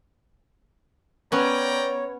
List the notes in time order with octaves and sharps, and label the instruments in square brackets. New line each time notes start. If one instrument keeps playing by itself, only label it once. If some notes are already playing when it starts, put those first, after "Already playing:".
[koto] B3 C#4 [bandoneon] C#5 [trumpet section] D5 G5 A#5